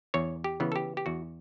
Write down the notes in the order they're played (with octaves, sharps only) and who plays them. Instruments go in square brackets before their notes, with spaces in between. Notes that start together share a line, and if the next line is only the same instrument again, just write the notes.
[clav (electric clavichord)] E2 C#5
G4
C#3 E3 B3
A4
G4
G4
E2 F#4